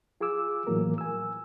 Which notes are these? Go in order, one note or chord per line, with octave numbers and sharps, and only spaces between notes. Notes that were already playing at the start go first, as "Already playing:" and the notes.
F4 G#4 G#5 D6 E6
A2 E3 F#3 A#3 A#4
G#5 E6